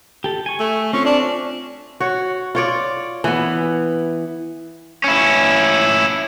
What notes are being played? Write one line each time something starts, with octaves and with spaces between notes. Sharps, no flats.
G4 A4
G#5 C#6
A3
C4 C#4 F4
D4
F#4 C#5
F4 C#5 D5
E3 B3
C#4 E4